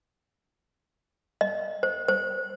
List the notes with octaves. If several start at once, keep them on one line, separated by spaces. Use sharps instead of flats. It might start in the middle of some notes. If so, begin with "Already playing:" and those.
D#5
C5
C5